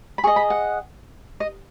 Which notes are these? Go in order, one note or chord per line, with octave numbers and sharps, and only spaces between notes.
B5
G#4 D#5 C#6
B5
F#5
D#5